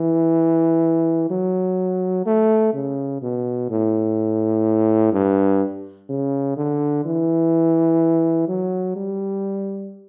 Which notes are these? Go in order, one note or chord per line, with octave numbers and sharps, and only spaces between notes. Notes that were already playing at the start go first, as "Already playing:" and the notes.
Already playing: E3
F#3
A3
C#3
B2
A2
G2
C#3
D3
E3
F#3
G3